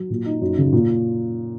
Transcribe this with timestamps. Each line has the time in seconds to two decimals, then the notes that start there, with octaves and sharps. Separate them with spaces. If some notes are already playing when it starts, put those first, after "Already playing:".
Already playing: F#3
0.10 A#2
0.26 D#4
0.41 F#2
0.58 C#3
0.73 A#2